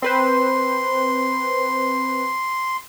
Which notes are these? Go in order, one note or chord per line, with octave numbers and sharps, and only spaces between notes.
C4 B4 C5 C6